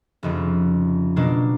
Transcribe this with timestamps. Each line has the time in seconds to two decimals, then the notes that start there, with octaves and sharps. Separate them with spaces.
0.23 F1 F2 C#3
1.16 B2 F#3 A#3 D4